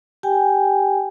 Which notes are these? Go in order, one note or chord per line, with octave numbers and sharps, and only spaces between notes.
G4 G5 G#5